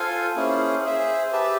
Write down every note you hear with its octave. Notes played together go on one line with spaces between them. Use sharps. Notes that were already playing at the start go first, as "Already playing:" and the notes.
Already playing: F4 A4 C5 F5 G#5
A#3 C#4 E4 G#4 C5
G#4 C5 E5
G4 B4 E5 A5